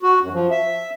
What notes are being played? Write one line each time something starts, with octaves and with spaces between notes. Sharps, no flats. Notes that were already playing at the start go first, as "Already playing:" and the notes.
F#4
F#2
F3
E5